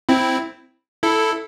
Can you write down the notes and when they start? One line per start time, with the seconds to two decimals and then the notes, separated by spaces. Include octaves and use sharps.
0.09 C4 E4
1.03 E4 A4